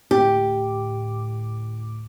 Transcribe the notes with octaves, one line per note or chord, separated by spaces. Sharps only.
D2 A2 G4 D6